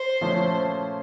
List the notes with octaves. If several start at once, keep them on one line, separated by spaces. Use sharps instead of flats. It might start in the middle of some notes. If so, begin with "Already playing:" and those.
Already playing: C5
A#2 F3 A3 C#4